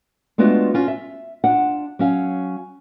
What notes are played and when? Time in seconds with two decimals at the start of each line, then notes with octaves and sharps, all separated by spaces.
0.38 G#3 A3 B3 D4 F4 F#4
0.74 C#4 F4 F#4
0.88 E5
1.44 D4 F4 F#5
1.99 F#3 C#4 F5